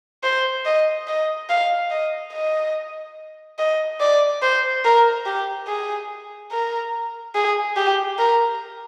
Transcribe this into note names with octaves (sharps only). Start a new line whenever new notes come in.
C5
D#5
D#5
F5
D#5
D#5
D#5
D5
C5
A#4
G4
G#4
A#4
G#4
G4
A#4